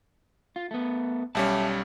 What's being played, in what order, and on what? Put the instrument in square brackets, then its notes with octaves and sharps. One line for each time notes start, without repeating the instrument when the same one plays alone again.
[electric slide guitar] F4
A3 B3
[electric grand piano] B1 G3 C#4 [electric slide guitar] E5 A5